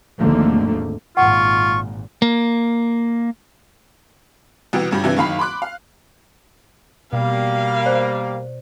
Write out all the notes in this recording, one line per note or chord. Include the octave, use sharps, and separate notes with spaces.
G#1 D#2 D3 F3 A3 A#3
G#1 A#2 F4 F#5 C#6
A#3
C2 B2 E3 B3 G5
G1 G2 G3
G2 C3 E3 D4
F#1 D#3 F5 B5
B5 C6 D6 F#6
F5
B2 G3 A#3 F5
C5 D5